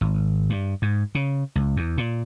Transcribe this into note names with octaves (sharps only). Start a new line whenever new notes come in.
G#1
G2
G#2
C#3
C#2
E2
A#2